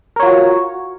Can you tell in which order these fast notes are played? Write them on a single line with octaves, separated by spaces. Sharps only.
A#4 C#5 F4 F#4